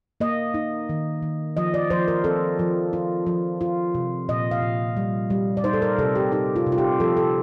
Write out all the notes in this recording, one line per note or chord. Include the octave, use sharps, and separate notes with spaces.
A#3 D#5
D#4
D#3
D#3
F3 D#5
D5
F3 C5
A#4
C4 A4
F3
F4
F3
F4
C3
A#2 D#5
F5
A#2
G3
G3
D5
D#4 C5
A4
A#4
C3 A4
G4
D#4 G4
F4
C3
F4
G4
F3 A4
A4